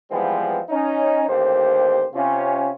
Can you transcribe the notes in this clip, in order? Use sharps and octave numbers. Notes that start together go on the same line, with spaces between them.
E3 F3 G3 G#3 B3 C4
C#4 D#4
A1 D#2 G4 C5
C3 C#4 F4